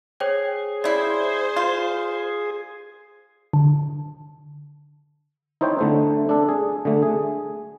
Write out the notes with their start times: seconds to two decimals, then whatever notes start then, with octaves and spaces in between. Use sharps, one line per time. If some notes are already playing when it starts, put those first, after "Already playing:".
0.20 G#4 C5 C#5 G5
0.84 C#3 E4 C5 D5
1.56 F4
3.53 D3
5.61 D#4 E4 C5 C#5 G5
5.79 D3 A3 C5
6.29 D4 A4
6.49 G#4
6.85 D3 A3
7.02 G#4